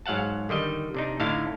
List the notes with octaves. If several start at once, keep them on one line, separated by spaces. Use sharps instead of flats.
G#2 F#3 F5 F#5 A5
D3 D#3 G3 D#5
C3 D4 D#4
A2 D3 D#4 E4 F5 A5